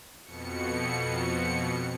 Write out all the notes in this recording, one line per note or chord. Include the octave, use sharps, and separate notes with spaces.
F2 B2 C#7